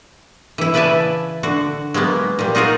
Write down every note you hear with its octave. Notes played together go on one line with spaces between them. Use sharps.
E3 E4
C#3 B4 D5 E5 G#5 A5
D3 F#4
F#3 G#3 A#3 B3
A#2 G3
D#4 F4 F#4 G#4 A#4